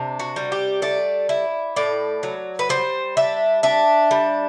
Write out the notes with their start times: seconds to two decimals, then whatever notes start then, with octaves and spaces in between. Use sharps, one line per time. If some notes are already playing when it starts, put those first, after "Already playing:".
Already playing: C3 D4
0.19 F#4
0.36 G3
0.52 G4
0.82 A3 D5
1.29 E4
1.76 A2 D5
2.23 F#3
2.59 B4
2.69 G3 C5
3.17 D4 E5
3.63 D4 E5
4.11 G3